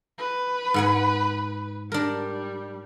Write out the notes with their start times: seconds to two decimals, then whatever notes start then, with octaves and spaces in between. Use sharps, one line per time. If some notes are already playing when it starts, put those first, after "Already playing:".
0.18 B4
0.74 G#2 F#5 G#5
1.92 G3 D4 A#4